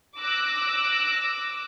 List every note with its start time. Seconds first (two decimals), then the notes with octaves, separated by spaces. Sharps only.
0.20 D6 E6 F#6 A#6